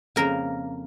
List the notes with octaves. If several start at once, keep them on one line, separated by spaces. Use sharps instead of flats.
F2 C#3 A#3 A#4